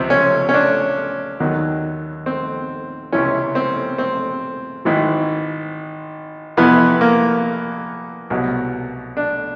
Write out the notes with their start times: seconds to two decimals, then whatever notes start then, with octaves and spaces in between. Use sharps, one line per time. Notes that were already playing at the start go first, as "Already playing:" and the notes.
Already playing: C#2 C3 F3 C4
0.10 C#4
0.49 C#4
0.54 D4
1.40 D#2 D#3 F#3
2.26 C4
3.12 C#2 C3 E3 C#4
3.55 C4
3.98 C4
4.85 G#1 G#2 E3
6.57 F2 C3 E3 B3
7.01 A#3
8.30 C2 B2 F#3
9.17 D4